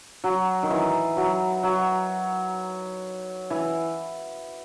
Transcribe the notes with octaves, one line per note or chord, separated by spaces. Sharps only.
F#3
D#3
E3
F#3
F#3
E3